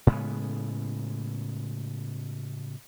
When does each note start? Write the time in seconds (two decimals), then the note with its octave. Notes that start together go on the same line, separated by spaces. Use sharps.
0.07 A2 C#3 G#3 B3